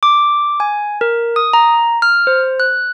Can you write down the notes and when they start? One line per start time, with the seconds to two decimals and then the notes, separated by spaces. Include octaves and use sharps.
0.03 D6
0.60 G#5
1.01 A#4
1.36 D#6
1.53 A#5
2.02 F6
2.27 C5
2.60 F#6